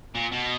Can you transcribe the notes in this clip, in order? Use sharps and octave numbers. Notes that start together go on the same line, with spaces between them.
A#2
B2